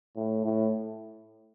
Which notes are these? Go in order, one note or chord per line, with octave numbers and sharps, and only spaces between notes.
A2
A2